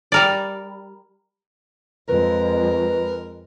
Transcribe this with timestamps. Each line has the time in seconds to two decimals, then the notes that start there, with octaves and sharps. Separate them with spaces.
0.12 G3 A#4 D5
2.08 F2 G#3 A#4 B4